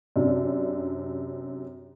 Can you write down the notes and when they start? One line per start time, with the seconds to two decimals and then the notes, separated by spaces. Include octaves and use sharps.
0.16 F#2 C3 D4